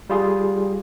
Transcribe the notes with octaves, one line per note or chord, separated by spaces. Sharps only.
G3 F4 G#4